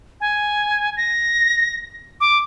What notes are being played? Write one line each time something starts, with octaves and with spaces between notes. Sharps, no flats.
G#5
A#6
D6